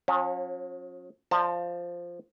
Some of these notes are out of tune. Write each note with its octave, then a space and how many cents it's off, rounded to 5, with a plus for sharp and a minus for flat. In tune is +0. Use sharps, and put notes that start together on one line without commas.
F3 +45 C#4 -25
F3 +0 D5 +0 A5 +30